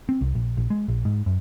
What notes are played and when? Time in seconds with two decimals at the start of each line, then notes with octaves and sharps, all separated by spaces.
0.09 C4
0.21 C2
0.35 A#1
0.57 A#1
0.70 G#3
0.88 A#1
1.05 G#2
1.26 F#2